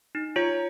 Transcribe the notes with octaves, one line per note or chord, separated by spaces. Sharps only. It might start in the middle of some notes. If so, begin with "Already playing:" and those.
D#4
F4 C#5